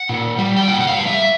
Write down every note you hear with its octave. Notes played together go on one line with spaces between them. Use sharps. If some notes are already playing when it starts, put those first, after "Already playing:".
Already playing: F#5
A#2
G3
G5
A#2 F#5
F#5
F5
G3
E5